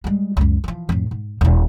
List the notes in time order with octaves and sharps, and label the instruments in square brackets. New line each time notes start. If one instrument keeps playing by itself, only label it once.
[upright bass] G3 G#3
C#2 F#2
E3 F3
F2 A2
G#2
D#1 E4